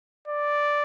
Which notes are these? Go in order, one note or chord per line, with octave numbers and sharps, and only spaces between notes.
D5